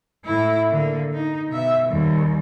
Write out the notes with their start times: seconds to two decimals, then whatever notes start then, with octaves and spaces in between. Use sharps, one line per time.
0.25 A2 E4
0.69 D3 A#3
1.14 D#4
1.48 B2 E5
1.87 D#2 G3